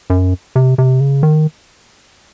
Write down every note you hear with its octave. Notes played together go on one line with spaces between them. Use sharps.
F#2
C3
C3
C#3
D#3